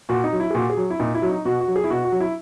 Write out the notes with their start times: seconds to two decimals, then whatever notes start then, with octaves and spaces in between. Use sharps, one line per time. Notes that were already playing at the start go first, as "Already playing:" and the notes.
0.09 A#2 F#4
0.24 D#4
0.33 F#3
0.40 E4
0.50 G#4
0.55 A#2 F#4
0.70 G#4
0.77 F#3
0.90 E4
0.99 A#2 D#4
1.15 E4
1.22 F#3
1.30 D#4
1.45 B2 F#4
1.61 F#4
1.68 F#3
1.76 G#4
1.84 E4
1.90 B2 F#4
2.05 F#4
2.12 F#3
2.20 E4